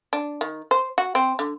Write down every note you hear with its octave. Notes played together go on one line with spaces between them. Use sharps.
D4
D#3
C5
F#4
C4
D3